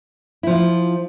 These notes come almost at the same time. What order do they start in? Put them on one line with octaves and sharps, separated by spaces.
E4 F3 F4